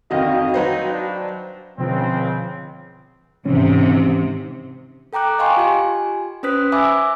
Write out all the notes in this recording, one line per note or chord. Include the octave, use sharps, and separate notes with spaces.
F2 D3 D#3 F#4 D#5 F5 G5
F#3 D#4 B4 C5
D4
C#2 B2 D3 F3 C4
G#2 C3 D#3 E3 C#4
A4 G5 A#5 D6 F#6
D#5 F5 G5 G#5 C6 C#6
F4 G4 G#5
C#4 B4 C5 D#6 F#6 B6
E5 G#5 B5 D6 E6